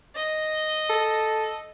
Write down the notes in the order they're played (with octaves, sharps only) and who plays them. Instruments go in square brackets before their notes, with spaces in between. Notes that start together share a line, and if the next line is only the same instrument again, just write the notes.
[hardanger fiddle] D#5
[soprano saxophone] A4